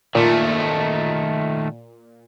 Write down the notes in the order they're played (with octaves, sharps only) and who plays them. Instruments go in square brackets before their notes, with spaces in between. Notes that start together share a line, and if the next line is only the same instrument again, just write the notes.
[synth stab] A#2 [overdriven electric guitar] D#3 A3